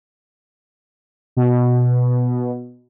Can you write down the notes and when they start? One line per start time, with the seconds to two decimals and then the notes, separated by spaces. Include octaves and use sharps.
1.37 B2